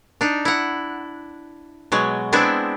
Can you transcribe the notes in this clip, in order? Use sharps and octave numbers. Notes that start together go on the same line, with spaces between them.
D4 D#4
E4 F#5
B2 F#3 G#3
G#3 B3 C4 D4 E4